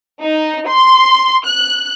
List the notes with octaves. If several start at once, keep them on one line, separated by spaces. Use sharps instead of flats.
D#4
C6
F#6